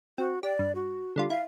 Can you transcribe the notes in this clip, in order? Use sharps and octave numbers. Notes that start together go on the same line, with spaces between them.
C4 F#4
G4 D5
G2
F#4
D3 G3 F4
E4 F5